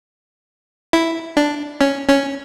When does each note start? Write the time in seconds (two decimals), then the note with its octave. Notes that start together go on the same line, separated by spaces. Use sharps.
0.93 E4
1.37 D4
1.81 C#4
2.09 C#4